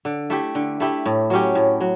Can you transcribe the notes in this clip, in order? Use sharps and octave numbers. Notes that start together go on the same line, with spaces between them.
D3
A3 E4 G4
D3
A3 E4 G4
A2
F#3 C#4 G4
A2
F#3